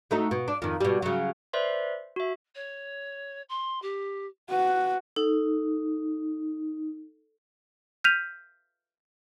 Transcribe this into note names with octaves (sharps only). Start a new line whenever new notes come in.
F#3 A3 D#4
B2
D4
F2 D#3
B2 G3
C#3 F#3
B4 C5 D5 E5 C6
F#4 E5
C#5
C6
G4
F#4 B4
D#4 A4
F6 G6 B6 D#7 F7